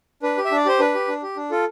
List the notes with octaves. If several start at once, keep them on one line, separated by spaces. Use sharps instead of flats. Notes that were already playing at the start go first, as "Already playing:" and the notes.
D4 B4
G4
E5
D4 D5
G4 C5
D4 B4
G4
D4
G4
D4
F4 A4